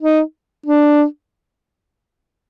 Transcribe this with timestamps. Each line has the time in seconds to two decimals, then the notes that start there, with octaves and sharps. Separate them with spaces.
0.01 D#4
0.66 D4